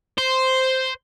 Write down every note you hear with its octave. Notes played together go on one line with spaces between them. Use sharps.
C5